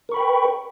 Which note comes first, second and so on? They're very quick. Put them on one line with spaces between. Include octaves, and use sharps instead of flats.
A#4 C#6 B5 G5 B4